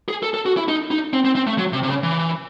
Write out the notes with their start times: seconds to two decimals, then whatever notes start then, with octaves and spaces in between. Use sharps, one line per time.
0.08 G#4
0.23 A4
0.34 A4
0.46 F#4
0.57 E4
0.68 D#4
0.91 D#4
1.13 C4
1.25 C4
1.35 C4
1.47 A3
1.58 F#3
1.73 C3
1.83 C3
1.89 C#3
2.03 E3